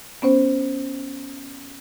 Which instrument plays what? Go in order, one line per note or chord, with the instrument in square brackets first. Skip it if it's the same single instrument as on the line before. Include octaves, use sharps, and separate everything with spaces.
[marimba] B3 C#4 C5